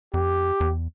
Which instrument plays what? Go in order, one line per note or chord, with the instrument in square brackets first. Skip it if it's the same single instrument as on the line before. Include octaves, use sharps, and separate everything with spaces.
[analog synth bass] F2 [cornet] G4
[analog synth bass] E2